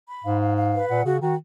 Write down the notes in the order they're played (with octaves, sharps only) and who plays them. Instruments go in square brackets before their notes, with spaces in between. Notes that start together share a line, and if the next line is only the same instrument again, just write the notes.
[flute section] B5
[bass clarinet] G#2 [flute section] F5
[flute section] F5
F5
B4
[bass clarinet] A#2 [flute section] F#5
[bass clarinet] C#3 [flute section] F#4
[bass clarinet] D#3 [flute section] F#4